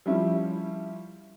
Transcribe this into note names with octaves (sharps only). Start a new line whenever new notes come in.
F3 G3 C#4 E4